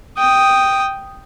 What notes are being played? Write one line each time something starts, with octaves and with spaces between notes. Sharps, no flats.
G5 D#6